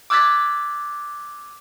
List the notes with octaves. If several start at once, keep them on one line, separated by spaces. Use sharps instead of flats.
D6 E6 F#6 G#6 A6 B6